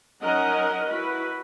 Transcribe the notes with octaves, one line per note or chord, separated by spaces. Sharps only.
F#3 C#4 D#4 A#4 D#5 F#5
E4 F#4 B4